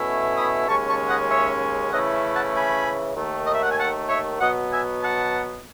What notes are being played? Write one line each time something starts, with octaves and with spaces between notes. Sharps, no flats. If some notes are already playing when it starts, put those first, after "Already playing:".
Already playing: B2 A3 C#4 E4
B5 D#6
D#2 C#3 G#3 C#4 A5 C#6
A5 C#6
D#5 F#5
C#5 E5
C#3 E3 A3 C#4 E4 D#5 F#5
F#5 A5
G#5 B5
D#2 D#3 A3
D#5
E5
F#5
G#5
F#5 A5
C#5 E5
B2 F#3 B3 D#5 F#5
E5 G#5
F#5 A5